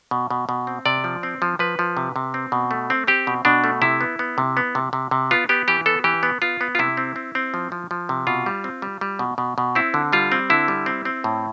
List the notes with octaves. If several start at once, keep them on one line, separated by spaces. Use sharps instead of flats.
B2
B2
B2
C4
C3 D5
F3
C4
F3
F3 B4
F3
C3
C3
C4
B2
A3
C4
C4 G4
B2
B2 D4
A3
C3 E4
B3
B3
C3
B3
C3
C3
C3
B3 F4
B3 G4
E3 G4
B3 A4
E3 G4
B3
B3 F4
B3
F4
C3 E4
C4
C4
C4
F3
F3
F3
C3
B2 F4
G3
C4
G3
G3
B2
B2
B2
C4 E4
D3
G3 F4
C4
D3 E4
G3
C4
C4
A2